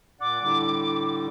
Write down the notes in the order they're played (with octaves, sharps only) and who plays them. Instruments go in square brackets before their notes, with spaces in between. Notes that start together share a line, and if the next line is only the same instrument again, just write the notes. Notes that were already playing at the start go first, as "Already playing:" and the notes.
[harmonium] A#2 D5 F#5 [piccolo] D6
[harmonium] A2 D3 G3